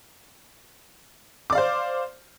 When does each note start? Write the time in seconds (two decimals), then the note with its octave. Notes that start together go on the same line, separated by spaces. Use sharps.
1.50 D6
1.52 D5
1.55 F5
1.58 C5